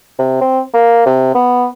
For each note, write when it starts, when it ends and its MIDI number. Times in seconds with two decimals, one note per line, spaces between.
0.19 0.41 48
0.41 0.61 60
0.74 1.02 58
1.06 1.34 48
1.35 1.67 59